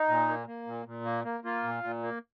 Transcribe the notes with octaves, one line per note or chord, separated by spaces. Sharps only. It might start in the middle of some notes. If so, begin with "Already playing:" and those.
Already playing: D#4
A#2
A#3
A#3
A#2
A#2
A#3
A#3
A#3 F4
A#2
A#2
A#3